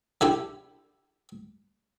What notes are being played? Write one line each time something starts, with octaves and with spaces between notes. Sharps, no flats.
D3 E4 G4